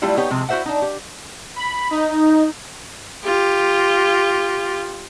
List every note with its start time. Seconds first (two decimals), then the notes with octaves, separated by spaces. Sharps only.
0.02 F#3 G3 A3 E4 F4 G4
0.17 B3 D#4 G4 C#5
0.30 C3 F3 G#3
0.49 E4 F#4 G4 C5 E5 F#5
0.66 D4 D#4
0.82 G4
1.56 B5
1.91 D#4
3.25 F4 G4